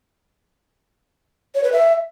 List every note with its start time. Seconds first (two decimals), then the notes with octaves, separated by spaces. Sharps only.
1.55 C#5
1.64 B4
1.72 E5